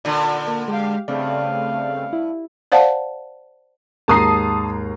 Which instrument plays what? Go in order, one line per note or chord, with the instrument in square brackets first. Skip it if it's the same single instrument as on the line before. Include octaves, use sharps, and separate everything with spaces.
[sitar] A#2 D3 [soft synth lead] D5
[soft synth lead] A#3
[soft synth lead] G#3 [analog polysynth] G4 F5
[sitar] G2 [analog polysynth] C#3 A3 C4 [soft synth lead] D5 [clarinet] F5
[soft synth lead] E4
[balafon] C5 D5 F5 F#5 A5
[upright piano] D#2 G#2 A#5 [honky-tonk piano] A5 D#6 C7